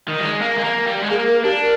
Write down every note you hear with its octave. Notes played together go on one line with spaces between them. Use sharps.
D#3
G3
G#3
A#3
G#3
A#3
G3
G#3
A#3 G#4
A#4
D4 G4
A#4